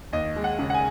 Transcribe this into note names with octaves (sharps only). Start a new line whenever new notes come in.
D#2 D#5
G#3
F#5
C#3
F#5
G#5